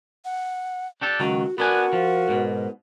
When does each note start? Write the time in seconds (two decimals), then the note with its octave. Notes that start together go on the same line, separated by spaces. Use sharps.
0.25 F#5
1.01 D4 G4 A4
1.20 C#2 D#3 F#3 F#4
1.58 B3 D4 F#4 A#4 G#5
1.93 F3
2.29 G#2 B2